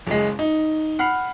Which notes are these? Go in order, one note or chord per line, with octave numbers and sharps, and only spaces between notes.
F#1 G#3
D#4
F#5 B5 F6 C7